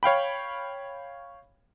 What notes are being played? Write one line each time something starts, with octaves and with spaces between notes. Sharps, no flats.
C#5 F5 G5 B5